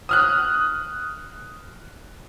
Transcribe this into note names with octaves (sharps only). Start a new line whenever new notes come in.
D#6 F6 F#6